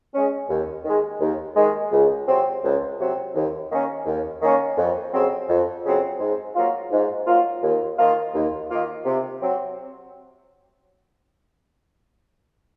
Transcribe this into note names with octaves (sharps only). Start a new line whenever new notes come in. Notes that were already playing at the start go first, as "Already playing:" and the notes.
G#3 C#4
D#2
D#3 G#3
D#2
D#3 G#3
C#2
C3 F#3 C4
C#2
C3 F#3 C4
D#2
D#3 A#3 C#4
D#2
D#3 A#3 C#4
F2
C#3 F#3 C4
F2
C#3 F#3 C4
G#2
F#3 A#3 F4
G#2
F#3 A#3 F4
D#2
D#3 A#3 F4
D#2
D#3 A#3 F4
C3
F#3 C4